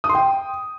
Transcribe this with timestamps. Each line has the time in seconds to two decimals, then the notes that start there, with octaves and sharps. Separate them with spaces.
0.04 D#6
0.09 C6
0.15 G5